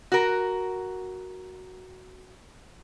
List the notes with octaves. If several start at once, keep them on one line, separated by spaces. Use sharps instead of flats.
F#4 A#4